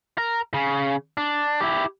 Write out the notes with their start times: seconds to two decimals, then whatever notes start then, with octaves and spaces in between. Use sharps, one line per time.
0.18 A#4
0.54 C#3
1.17 D4
1.60 E4 G4